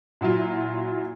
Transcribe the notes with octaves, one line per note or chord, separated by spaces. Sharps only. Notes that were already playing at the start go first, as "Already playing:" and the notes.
A#2 F#3 E4 F4